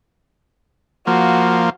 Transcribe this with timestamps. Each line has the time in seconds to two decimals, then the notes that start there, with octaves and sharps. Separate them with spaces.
1.07 F3 A#3 F#4